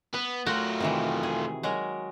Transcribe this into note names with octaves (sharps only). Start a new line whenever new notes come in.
B3 B4
A3 F4 F#4 A#4 F#5
C3 D#3 E3
G#4
F#3 G#3 A#4